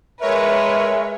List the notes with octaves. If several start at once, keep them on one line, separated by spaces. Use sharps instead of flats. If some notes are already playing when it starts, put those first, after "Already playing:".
G#3 A#4 B4 C#5 E5